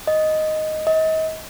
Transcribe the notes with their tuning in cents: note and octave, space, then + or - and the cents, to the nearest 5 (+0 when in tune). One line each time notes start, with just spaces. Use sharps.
D#5 +0
D#5 +35